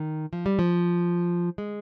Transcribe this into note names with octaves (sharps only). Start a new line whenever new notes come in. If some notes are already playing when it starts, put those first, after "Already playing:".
Already playing: D#3
F3
G3
F3
G#3